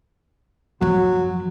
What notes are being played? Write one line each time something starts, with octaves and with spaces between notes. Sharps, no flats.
F#2 F3 F#3